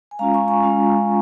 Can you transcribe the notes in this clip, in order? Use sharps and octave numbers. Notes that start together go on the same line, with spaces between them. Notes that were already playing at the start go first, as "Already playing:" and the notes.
G#5
G#3 C#4 F4 F5 A#5
G#5 C#6
G#5 C#6
G#3 C#4 F4